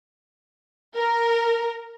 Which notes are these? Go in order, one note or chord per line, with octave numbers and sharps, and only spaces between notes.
A#4